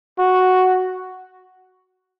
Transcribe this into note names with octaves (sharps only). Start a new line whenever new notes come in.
F#4